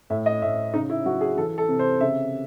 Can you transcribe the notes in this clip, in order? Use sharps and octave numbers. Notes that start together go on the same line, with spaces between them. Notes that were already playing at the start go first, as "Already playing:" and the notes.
A2 E5
D#5
A2 E5
C#3 D#4
E4
F#3 F#4
G#4
E3 A4
A4
C3
C5
C#3 E5